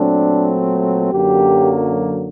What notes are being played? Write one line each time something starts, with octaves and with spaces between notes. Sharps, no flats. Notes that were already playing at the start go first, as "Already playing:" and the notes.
Already playing: A#2 F#3 A3 C4 D4
F#2 D3 F#3 A#3 G4